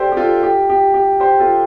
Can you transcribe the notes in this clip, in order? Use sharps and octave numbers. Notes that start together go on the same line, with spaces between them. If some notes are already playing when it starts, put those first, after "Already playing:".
Already playing: G4 A4 C5 D5
G4
F4 A4
G4
G4
G4
G4 C5
F4 A4